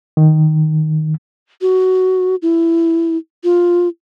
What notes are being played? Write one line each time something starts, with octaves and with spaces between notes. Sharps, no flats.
D#3
F#4
E4
F4